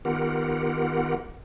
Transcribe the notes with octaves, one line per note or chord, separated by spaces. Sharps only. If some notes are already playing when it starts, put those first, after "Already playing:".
D#3 B3 F4 G4 A#4 F#5